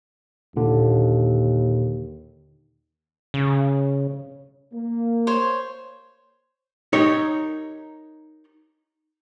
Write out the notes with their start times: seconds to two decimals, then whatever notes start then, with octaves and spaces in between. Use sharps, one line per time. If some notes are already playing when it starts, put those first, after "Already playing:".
0.56 D#2 A#2 D3
3.34 C#3
4.73 A#3
5.27 C5 C#5
6.93 D#4 G4 A#4 C#5